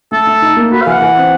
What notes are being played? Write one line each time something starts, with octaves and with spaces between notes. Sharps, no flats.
A3 A4
A3
D#4
A#3
F#4 B4
F5
E3 F#5
E3
C4